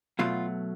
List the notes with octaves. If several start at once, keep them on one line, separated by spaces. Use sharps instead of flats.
B2 F#3 A3 F4